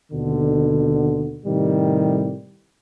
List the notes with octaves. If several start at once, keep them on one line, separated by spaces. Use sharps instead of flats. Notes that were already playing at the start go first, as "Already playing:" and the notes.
D#2 B2 D3
A2 C3 D#3 G3